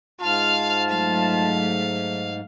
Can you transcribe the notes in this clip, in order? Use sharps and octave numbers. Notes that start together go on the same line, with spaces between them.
G#2 F4 F5 A5 F6
F#3 A3 F5